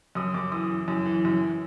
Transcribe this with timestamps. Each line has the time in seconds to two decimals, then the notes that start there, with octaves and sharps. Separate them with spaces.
0.15 F#2 D#6
0.34 F#2 D6
0.52 E3 D#6
0.70 E3
0.88 F#2
1.06 E3
1.25 F#2